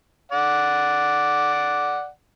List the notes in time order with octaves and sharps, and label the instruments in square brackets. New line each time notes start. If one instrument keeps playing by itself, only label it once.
[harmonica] D5 F#5